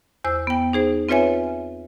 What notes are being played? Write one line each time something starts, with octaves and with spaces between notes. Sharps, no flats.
E2 C5 E6
B3 G5
D#4 G#4 C5
C4 F4 B4 C#5 E5 G#5